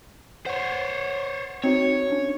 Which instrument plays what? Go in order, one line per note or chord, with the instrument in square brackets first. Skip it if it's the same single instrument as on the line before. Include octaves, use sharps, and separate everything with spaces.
[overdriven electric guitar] C5 C#5 [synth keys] F#5
[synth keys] C4 D#4 F#4 [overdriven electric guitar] C#5
[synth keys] C#4 D4